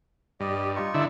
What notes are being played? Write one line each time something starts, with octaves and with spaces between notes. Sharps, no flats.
G2 D5 D#5
D#4 F4 C#6
D3 E4